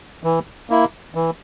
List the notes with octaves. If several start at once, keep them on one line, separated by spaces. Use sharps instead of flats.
E3
A#3 E4
E3